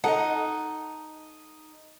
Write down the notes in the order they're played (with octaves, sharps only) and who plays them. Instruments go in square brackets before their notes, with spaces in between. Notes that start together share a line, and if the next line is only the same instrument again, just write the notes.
[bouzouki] D#4 [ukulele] A4 [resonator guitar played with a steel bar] D#5 F#5